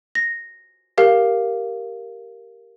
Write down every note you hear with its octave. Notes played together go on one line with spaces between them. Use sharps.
A#6
G4 A#4 F5